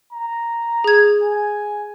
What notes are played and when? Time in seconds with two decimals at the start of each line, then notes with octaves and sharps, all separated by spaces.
0.13 A#5
0.84 G#4 G#6
1.23 G#5